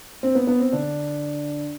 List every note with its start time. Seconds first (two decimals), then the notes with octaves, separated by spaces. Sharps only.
0.23 C4
0.35 B3
0.47 B3
0.60 C4
0.72 D3 D4